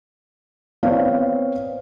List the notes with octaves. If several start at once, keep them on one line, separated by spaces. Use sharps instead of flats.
B3 C4 C#5 D5 F5